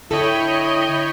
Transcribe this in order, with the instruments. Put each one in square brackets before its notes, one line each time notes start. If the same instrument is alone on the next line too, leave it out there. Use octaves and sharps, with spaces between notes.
[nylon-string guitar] D3 A4 [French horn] E4 [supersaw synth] C#5 G5 B5 [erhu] D#5